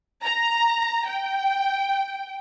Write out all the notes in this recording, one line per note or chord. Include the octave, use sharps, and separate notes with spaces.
A#5
G5